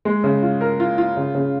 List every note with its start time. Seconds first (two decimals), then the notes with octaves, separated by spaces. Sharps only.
0.05 G#3
0.24 C#3
0.42 F4
0.61 A#4
0.80 F4
0.98 F4
1.17 C#3
1.35 C#3